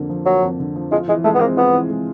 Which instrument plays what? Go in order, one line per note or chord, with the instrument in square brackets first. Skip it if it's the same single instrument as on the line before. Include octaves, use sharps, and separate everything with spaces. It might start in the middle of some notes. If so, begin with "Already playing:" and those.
Already playing: [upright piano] F2 D3 A#3
F3
[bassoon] F#3 [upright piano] A#3
[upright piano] F2
D3
F3
[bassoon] G#3 [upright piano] F4
[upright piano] E3 [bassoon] G#3
[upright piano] G#3 [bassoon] A3
[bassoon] B3
[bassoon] A#3 [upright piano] C4
[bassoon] B3 [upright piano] F4
[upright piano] E3
G#3